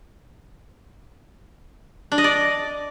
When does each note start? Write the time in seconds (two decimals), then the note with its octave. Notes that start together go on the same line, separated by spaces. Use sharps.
2.12 D4
2.18 D#5
2.24 D5